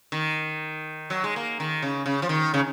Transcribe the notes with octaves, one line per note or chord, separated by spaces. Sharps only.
D#3
F#3
G#3
A#3
D#3
C#3
C#3
F3
D#3
C#3